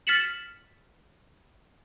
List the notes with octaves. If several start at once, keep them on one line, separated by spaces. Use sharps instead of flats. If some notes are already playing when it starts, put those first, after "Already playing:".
F6 A6 B6 C#7 E7 F#7